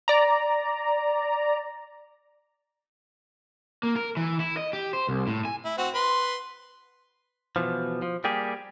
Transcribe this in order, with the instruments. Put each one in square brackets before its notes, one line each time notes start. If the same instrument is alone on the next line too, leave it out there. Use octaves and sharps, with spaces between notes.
[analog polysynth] D5 A#5
[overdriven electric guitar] A#3
A#4
E3
E4
D#5
G4
C5
C2
A2
G#5
[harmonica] E4
C4 F#4
B4 C6
[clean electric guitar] B2 E3 F3
F3
G3 A#3 G4 G#4